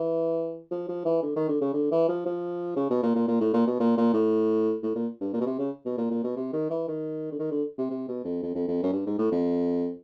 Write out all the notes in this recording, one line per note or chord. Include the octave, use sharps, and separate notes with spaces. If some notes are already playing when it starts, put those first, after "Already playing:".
Already playing: E3
F3
F3
E3
D3
D#3
D3
C#3
D3
E3
F3
F3
C#3
B2
A#2
A#2
A#2
A2
A#2
B2
A#2
A#2
A2
A2
A#2
G2
A#2
B2
C3
C#3
B2
A#2
A#2
B2
C3
D#3
E3
D#3
D3
D#3
D3
C3
C3
B2
F2
F2
F2
F2
F#2
G2
G#2
A2
F2